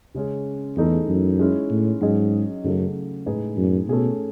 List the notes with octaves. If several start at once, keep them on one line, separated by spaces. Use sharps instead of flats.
C#3 G#3 C#4 G#4
E2 E3 A3 D#4 G#4
F#2
G#3 C#4 E4
A2
G#2 F#3 C#4 G#4 D#5
F#2 C#3 F#3 A3
A2 G#3 D#4 G#4 B4
F#2
B2 A3 C#4 G#4